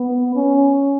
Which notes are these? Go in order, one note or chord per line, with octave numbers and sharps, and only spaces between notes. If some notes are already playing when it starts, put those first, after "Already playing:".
Already playing: B3
C#4